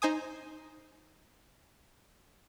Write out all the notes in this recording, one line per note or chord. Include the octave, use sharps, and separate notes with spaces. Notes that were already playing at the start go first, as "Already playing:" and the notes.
D#4 C5 G#5 D#6